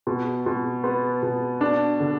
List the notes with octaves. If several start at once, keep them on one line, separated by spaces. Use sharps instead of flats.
B2
B2
B3
B2
D4
D3